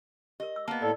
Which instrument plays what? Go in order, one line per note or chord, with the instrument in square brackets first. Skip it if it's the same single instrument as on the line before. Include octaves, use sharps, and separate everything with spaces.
[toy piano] G4 A#4 [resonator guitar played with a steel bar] D#5
[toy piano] E6
[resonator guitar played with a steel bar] A#3 B3 [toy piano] D#5 A5
[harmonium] A2 A4 [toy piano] D5